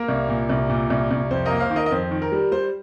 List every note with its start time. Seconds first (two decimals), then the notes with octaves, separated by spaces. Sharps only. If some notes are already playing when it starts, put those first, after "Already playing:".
Already playing: A#3 A#4
0.08 C2
0.29 A#2
0.50 C2
0.70 A#2
0.90 C2
1.11 C2
1.31 F2 C5
1.45 A#3 A#4 D#5
1.60 C5 F5
1.70 D#3
1.76 A#4 D#5
1.86 D#5
1.91 F2 C5
2.11 D#3
2.22 A#4
2.32 G3
2.52 G3 C5